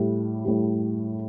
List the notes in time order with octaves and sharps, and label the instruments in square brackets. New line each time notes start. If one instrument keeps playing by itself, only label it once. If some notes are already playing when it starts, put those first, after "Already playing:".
Already playing: [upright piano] A2 G3
A2 G3